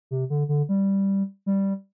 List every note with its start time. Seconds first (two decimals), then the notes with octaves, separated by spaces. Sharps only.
0.11 C3
0.30 D3
0.49 D3
0.69 G3
1.46 G3